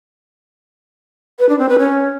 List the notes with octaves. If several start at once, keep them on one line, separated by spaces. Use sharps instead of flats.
B4
D4
C4
B4
C#4